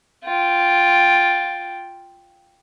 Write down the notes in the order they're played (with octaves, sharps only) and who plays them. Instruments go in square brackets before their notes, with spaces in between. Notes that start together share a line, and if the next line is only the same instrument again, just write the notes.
[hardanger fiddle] F4 G5